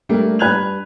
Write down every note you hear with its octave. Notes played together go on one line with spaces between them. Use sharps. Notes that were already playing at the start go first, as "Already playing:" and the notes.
G3 A3 A#3 D4
G2 B4 F#6 G#6 F7